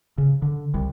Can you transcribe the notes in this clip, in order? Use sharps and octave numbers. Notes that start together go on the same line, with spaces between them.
C#3
D3
C2